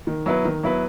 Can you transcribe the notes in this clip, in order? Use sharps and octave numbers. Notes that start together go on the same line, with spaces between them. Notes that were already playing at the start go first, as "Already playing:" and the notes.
D#3
F#3 B3 E4 B4
D#3
F#3 B3 E4 B4